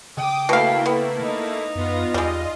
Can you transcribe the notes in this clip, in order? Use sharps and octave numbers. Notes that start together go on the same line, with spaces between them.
C#3 G5 D6 D#6
B2 A3 A#3 E4 F5
B3
D#4
F#2 B3 F4
E2 G3 G#3 F4 D#5